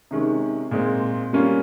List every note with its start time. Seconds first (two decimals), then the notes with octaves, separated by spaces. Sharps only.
0.11 C3 D#3 G#3 C#4
0.71 A#2 G#3 C4
1.33 G3 A#3 C#4 F4